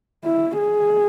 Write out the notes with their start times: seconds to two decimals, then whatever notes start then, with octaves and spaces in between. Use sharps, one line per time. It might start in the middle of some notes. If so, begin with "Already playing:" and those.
0.25 E4
0.58 G#4